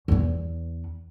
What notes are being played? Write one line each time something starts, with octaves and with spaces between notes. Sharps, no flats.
E2 B3